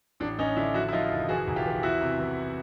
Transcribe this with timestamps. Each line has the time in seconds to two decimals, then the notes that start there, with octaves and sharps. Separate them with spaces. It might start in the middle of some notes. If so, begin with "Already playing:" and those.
0.20 A1 D4
0.38 A1 C#4 D#4
0.56 D3 D4 E4
0.74 F3 E4 F#4
0.88 E4
0.92 F3 D#4 F4
1.11 F#1
1.29 E3 F#4 G#4
1.47 B1
1.56 F4 G4
1.65 E3
1.83 E2 E4 F#4
2.01 C3
2.20 E3